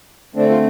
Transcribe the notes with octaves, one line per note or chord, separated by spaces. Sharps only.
D3 A3 C4 D4
F4